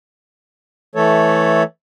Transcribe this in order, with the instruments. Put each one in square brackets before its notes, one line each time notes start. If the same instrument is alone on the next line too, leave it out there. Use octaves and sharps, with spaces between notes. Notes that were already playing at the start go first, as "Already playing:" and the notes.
[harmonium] E3 A3 A4 C#5